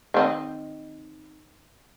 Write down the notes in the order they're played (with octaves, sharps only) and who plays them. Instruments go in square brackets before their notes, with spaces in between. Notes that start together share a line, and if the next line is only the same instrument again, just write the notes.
[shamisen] D#3 C4 D#5